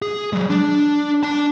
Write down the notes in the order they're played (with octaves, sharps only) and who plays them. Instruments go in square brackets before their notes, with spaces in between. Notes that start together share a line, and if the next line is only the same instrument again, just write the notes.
[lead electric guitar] G#4
F#3 G#3
D4
D4 A5